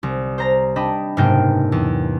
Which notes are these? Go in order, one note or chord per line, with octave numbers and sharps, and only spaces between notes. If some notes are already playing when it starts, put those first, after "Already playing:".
C2
C5 A#5 A#6
D4 D#5 G5 B5
F#1 G#2 C3 A#3 B3 G5
E2